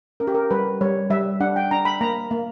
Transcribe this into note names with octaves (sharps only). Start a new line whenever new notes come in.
C#4 A#4
G4
A#4
G3 B4
G3 C#5
G3 E5
D4 F#5
G5
D4 A#5
B5
A#3 A#5
A#3